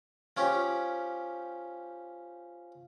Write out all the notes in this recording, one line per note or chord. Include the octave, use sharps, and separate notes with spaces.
F3 C#4 G4